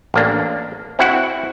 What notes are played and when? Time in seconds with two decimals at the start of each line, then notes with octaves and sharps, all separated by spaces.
0.14 A1 A#3 D4
0.99 C4 E4 F#4 F#5